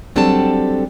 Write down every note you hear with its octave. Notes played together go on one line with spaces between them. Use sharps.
F#3 G3 C4 D4 A4 A5